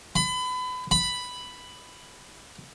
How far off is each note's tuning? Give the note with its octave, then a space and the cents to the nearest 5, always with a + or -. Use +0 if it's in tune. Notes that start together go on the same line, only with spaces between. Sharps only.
B5 +30
B5 +5